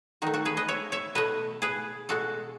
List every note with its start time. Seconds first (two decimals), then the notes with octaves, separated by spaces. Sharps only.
0.22 D#3 A3 D#4 F#4
0.34 F#4 A4
0.45 G#4 B4
0.57 B4 D#5
0.68 C#5 E5
0.92 C#5 E5
1.15 B2 A3 B4 D#5
1.62 G#4 B4
2.09 B2 G#3 F#4 A4